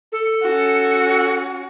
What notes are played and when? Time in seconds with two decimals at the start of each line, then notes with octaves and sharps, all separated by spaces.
0.12 A4
0.43 C#4 F#4